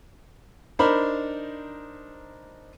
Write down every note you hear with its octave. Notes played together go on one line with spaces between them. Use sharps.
D4 D#4 A#4 C5 B5